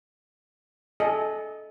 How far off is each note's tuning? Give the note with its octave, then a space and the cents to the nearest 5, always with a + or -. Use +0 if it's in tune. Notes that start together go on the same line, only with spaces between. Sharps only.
A4 -25 D#5 +0 G#5 -5